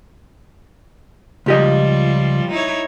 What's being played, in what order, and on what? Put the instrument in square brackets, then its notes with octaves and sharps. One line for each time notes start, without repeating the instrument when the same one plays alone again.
[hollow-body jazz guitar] C#2 G4 D#5 [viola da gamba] F3 G3
[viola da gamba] D#4 E4 C#5